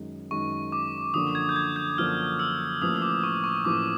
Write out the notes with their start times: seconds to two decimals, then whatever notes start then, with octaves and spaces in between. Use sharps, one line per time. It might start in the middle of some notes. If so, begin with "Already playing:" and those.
Already playing: F#2 D#3 G#3
0.31 F#2 D#3 G#3 C#6
0.72 D6
1.14 F#2 D3 F3 A#3 D4 D#6
1.35 G#6
1.49 G6
1.56 G#6
1.76 G6
1.98 F#2 D3 F3 A#3 D4 F6
2.39 E6
2.81 A1 A2 F3 A#3 D#6
3.02 D6
3.23 C#6
3.44 C#6
3.64 A1 A2 F3 A#3 D6